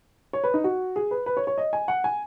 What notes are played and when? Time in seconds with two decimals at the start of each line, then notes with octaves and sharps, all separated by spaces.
0.33 C#5
0.44 B4
0.54 D#4
0.64 F#4
0.96 G#4
1.11 B4
1.26 B4
1.37 C#5
1.47 C#5
1.58 D#5
1.73 G#5
1.88 F#5
2.04 G#5